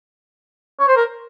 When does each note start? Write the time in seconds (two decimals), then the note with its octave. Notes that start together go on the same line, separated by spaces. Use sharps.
0.80 C#5
0.88 C5
0.97 A#4